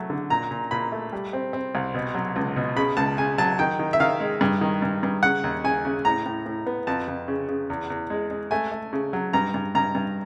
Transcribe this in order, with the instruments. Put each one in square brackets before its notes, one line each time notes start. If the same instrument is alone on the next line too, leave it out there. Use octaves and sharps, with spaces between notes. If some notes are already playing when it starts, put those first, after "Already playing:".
Already playing: [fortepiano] F#3 A3
D3
A#2 A#5
A#2
A#2 B5
A3
G3
C4
C4
C2
B2
F#3
C#2
B2
C#3 B5
C#2 A5
C#3 G#5
F#3 A5
D#3 G5
D#3
E5
D#3 F5
G#3
G2
D#3
G2
G2
C#3 F#5
D#2
C#3 G#5
C#3
A2 A#5
A2
A2
B3
F2 A5
F2
C#3
C#3
E2
E2
G#3
G#3
A3 G#5
A3
C#3
F#3
G2 A#5
G2
G2 A#5
G2